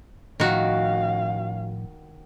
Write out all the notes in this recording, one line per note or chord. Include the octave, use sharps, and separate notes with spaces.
A2 D#3 F3 C#4 F#4 F5